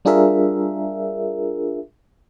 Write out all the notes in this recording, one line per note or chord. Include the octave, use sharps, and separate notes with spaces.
G3 D4 F4 G#4 A#4 E5